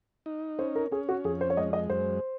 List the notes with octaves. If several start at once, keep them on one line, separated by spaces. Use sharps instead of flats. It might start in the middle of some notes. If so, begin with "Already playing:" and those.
D#4
C#4 C5
A#4
C#4 G#4
F#4
F2 G#4
C5
C#5
G#3 D#5
D#5
F#2 C5